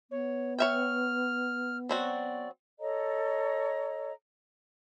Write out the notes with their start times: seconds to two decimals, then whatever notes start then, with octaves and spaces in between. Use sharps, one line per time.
0.11 B3 C#5
0.58 C#5 E5 G5 F6
1.89 F#3 C4 F#4 D5
2.80 A4 C#5 D#5 A#5